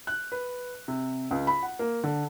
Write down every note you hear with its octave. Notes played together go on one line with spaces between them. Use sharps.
F#6
B4
C3
C#2
B5
F#5
A#3
D3